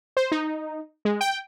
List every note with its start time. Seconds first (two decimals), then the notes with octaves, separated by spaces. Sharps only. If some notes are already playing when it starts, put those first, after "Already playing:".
0.17 C5
0.32 D#4
1.05 G#3
1.21 G5